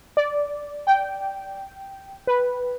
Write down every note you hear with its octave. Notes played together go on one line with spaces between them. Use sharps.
D5
G5
B4